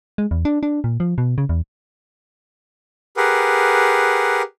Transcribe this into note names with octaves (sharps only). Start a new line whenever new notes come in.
G#3
E2
D4
D4
A#2
F3
B2
C#3
E2
G4 G#4 A#4 B4 F#5